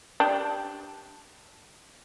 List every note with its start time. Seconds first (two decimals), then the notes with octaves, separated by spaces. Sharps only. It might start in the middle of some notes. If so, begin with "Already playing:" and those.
0.20 D4 G4